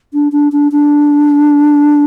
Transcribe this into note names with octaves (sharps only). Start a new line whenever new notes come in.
D4
D4
D4
D4